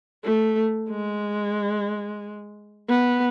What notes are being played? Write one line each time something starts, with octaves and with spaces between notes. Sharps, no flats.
A3
G#3
B3